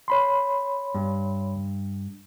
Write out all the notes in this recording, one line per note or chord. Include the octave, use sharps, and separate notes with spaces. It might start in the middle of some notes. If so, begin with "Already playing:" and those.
C#5 B5 C6
G2